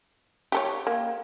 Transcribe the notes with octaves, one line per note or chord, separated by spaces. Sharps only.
G4 A4 C#5
A#3